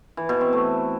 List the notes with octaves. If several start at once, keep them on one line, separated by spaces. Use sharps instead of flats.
E3
B2
C4
A3